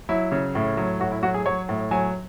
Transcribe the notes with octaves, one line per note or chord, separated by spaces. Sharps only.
F#3 E4
C#3
A2
F#3
A2 F#4
E4
F#3 F#4
G#4
F#3 C#5
A2
F#3 G#5